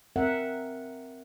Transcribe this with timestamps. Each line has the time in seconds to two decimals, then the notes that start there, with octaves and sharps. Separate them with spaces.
0.16 C4 A#4 E5 F#5